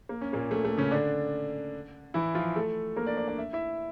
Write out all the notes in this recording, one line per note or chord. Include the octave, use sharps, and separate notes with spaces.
A#3
C#4
A#2 A#3
A3
A3
C#3 C#4
D3 D4
E3 E4
F3 F4
A3 A4
A#3 A#4
D4 D5
D4 D5
D4 D5
E5
E4 E5